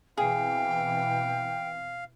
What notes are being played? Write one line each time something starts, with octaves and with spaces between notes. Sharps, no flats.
B2 E3 C4 G#4 F5 G5